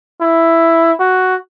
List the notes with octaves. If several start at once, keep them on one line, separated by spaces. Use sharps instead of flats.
E4
F#4